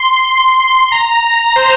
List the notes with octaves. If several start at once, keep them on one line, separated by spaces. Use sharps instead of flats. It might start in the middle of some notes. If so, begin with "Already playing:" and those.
Already playing: C6
C6
A#5
A#5
C5